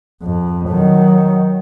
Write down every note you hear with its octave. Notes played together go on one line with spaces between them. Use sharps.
F2
D#3 F#3